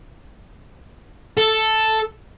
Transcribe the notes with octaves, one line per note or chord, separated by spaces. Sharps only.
A4